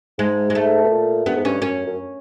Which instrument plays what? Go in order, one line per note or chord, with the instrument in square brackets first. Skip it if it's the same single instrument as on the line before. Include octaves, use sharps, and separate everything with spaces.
[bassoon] G#2 [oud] G#3
[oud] G#3
A3
[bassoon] B2
A#2
[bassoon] G2 [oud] B3
[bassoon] G#2
[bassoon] G2 [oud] C#4
[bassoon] F#2 [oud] C#4
[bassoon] F#2